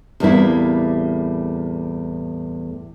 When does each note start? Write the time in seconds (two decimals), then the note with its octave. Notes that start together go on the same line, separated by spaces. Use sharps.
0.20 E2 A2 G3 A#3 C4 E4